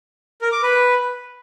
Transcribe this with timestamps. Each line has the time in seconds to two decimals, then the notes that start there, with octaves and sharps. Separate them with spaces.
0.42 A#4
0.52 D6
0.63 B4